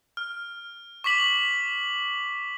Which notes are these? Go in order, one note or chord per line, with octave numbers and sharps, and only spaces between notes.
F6
C#6 D6 B6 F#7